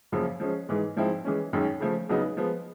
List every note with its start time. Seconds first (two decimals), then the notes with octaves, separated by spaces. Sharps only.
0.12 F#2 C#3 F3 A#3
0.40 F3 G#3 C#4
0.69 G#2 E3 G#3
0.96 G#2 F3 G#3 C4 E4
1.24 E3 G#3 C#4
1.53 F#2 D#3 G#3 C#4
1.80 C#3 F3 A3
2.09 E2 C#3 F#3 B3 D#4
2.37 F3 G#3 B3